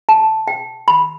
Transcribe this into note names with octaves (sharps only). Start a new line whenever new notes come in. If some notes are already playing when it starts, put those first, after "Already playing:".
A5
G5
B5